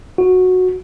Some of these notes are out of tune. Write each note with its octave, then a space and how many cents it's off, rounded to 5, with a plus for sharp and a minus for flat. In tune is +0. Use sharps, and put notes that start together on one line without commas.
F#4 -10